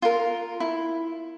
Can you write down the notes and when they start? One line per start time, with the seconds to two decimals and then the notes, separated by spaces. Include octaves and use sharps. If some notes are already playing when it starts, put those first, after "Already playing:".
0.02 F4 A#4
0.60 E4